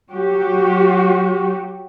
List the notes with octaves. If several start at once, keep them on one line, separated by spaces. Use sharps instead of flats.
F#3 F#4 G4